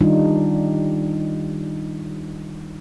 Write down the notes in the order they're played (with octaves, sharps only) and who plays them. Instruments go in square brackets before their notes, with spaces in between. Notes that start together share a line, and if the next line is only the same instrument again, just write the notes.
[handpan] D#3 G3 D4 D#4 F4